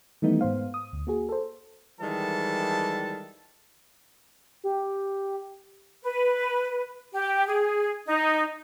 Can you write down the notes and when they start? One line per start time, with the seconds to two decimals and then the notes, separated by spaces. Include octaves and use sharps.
0.22 D#3 E3 G3 A3 B3 D#4
0.41 G#2 B3 C5 F5
0.74 D#6
0.93 D2
1.07 A#3 F#4 G#4
1.29 A4 C5
2.01 D#3 E3 G3 G#3 A4 A5
4.64 G4
6.03 B4
7.14 G4
7.47 G#4
8.07 D#4